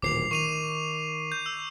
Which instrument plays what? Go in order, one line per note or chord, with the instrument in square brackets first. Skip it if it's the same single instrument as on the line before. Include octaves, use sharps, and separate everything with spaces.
[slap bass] D1 A#2 D#3 [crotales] D6 C7 F7
[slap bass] D#3 [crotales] C#6 D#7 F7
[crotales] G6
E6